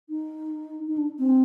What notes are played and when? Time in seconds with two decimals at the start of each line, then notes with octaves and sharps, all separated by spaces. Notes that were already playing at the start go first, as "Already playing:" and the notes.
0.09 D#4
0.87 D#4
0.98 D4
1.19 C4